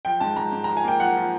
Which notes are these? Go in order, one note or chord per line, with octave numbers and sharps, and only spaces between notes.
F3 G5
G#2 A5
G#2 A#5
G#2
F3 A#5
G#5
A#3 G5
F3 F#5
F3